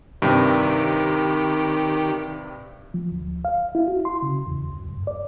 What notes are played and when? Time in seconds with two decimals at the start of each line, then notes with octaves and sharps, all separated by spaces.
0.22 G2 C3 D#3 G4
2.94 F3
3.11 D2
3.45 F5
3.75 E4
3.88 F#4
4.05 C6
4.22 C#3
4.47 E2
4.67 C#2
4.78 F#2
4.91 G2
5.07 D5